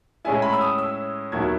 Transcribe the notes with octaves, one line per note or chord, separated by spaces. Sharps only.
A2 G#3 C#4 E4 G#5
B5
E6
D#6
E6
D#2 D#3 F#3 B3 E4 G#6